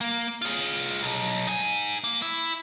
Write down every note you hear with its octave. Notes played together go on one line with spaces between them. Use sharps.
A#3
F4 G#4
B1
D#4 G#5
A#3
E4